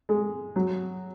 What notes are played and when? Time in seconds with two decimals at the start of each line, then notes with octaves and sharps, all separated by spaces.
0.09 G#3
0.56 F#3